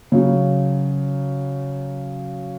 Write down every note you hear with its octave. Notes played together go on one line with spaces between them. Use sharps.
C#3 F#3